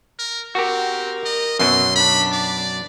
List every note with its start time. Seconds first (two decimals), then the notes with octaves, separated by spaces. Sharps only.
0.19 A#4
0.55 C4 F#4 G4 A#4
1.25 D#5
1.59 F#2 B2 F#3 C6
1.96 D4 B5
2.32 D5